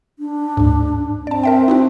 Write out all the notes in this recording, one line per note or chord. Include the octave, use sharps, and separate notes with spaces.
D4
D2 G#2
C4 D5 A5
A#4 E5 G5
D#4 E4 F#4